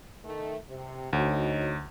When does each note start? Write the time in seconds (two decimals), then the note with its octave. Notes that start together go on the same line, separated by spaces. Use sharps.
0.25 D#3 A3
0.69 C3
1.13 D2 D#4 F#4 C#5